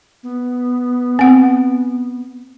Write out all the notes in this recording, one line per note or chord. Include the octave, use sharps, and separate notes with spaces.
B3
C4 F#5